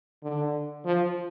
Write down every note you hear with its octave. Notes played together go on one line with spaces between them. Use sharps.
D3
F3